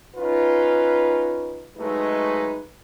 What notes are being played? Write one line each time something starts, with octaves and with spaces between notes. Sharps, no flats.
C#4 D#4 F4 B4
F#3 G#3 A3 D#4 B4